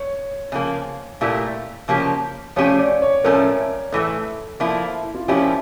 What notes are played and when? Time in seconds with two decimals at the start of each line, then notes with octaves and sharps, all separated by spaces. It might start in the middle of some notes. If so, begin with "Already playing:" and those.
Already playing: C#5
0.52 C#3 F3 A#3
1.21 A#2 A3 E4 G4 A#4
1.88 C#3 F3 A#3 C#4 G4
2.56 F3 A3 C#4 G4 C#5
2.79 D5
3.02 C#5
3.24 A2 F3 A3 C#4 A#4
3.92 A2 E3 A3 A4
4.60 F3 A#3 E4
5.03 E4
5.15 F4
5.28 F3 A#3 C#4 E4 G4